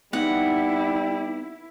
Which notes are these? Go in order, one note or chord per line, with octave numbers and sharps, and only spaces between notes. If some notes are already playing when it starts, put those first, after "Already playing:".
G3 B3 C4 D#4 E4 F#5